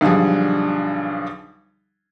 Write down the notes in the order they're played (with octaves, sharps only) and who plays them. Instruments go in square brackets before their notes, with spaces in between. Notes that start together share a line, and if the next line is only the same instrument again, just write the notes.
[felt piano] B1 D3 F3 G3 G#4